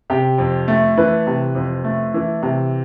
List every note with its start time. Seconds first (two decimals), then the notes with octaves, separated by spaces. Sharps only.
0.10 C3 G4
0.38 F2
0.68 A3
0.98 E3 B4
1.27 C3
1.55 F2
1.84 A3
2.14 E3
2.43 C3